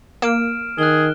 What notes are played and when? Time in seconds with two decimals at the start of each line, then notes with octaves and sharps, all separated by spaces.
0.22 A#3 F6 D7 E7
0.78 D#3 G#4 F#6 G7